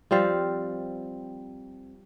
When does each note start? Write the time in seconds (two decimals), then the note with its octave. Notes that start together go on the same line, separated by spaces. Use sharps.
0.11 F3 G3 C4 F5